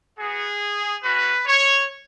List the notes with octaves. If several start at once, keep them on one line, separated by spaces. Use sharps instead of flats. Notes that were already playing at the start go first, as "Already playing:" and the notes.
B3 F#4 G#4
G#3 C#4 F#4 B4
C#5